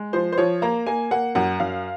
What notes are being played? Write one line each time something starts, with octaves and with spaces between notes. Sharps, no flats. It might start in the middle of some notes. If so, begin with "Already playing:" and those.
Already playing: G#3
F3 C5
C5
F3 C#5
A#3 A#5
A#3 G#5
A#3 F#5
F#2 F#5
F#2 F5